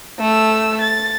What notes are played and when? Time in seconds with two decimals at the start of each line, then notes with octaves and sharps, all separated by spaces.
0.19 A3 E6
0.81 A6